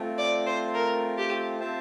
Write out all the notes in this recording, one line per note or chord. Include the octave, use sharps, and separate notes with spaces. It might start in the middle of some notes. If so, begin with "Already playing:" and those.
Already playing: A3 C4 F4
D5
C5
A#4
G4
C4 F4 C5 E5 A5